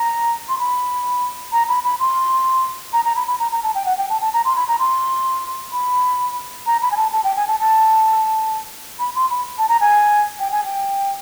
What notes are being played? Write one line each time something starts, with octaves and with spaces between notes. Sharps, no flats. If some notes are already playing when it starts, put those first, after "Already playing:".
Already playing: A#5
C6
B5
A#5
B5
B5
C6
A#5
A#5
B5
B5
A#5
A#5
A5
G5
F#5
G5
A5
A5
A#5
C6
B5
A#5
C6
B5
A#5
B5
G#5
A5
A5
G5
G#5
A5
A5
B5
C6
B5
A5
A#5
G#5
G5
G#5
G5